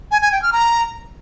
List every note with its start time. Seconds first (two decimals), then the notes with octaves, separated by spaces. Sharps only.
0.11 G#5
0.22 G#5
0.32 G5
0.42 F6
0.53 A#5